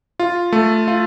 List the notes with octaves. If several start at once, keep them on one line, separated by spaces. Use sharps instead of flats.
F4
A3
F4